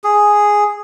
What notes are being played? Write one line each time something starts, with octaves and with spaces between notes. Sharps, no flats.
G#4